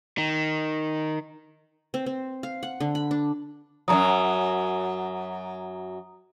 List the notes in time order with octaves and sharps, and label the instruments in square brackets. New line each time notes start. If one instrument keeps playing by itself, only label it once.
[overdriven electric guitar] D#3
[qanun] C4
C4
F5
F#5
D3
B5
D4
[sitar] F#2 A2 F#3 [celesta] A#5 D#6